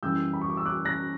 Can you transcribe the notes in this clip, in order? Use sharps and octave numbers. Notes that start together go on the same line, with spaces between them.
F#2 E3 G3 E6 G6
B5
C#6
D6
E6
D6 F#6
F#6 A#6